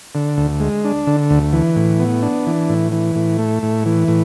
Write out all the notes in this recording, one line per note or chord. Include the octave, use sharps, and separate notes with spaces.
D3
D2
G#3
D4
D3
D2
E3
A2
B3
D4
E3
A2
E3
A2
A3
A2
E3
A2